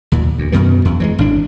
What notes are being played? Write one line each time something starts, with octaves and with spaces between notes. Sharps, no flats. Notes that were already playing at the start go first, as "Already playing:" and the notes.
D#2 A#2
D2
F#2 B2 D#3 E3
E2
E3 F#3 G#3
G#1 A2 D4